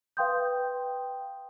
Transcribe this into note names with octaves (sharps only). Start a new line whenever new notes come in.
B4 F5 G5 C6 D#6 G6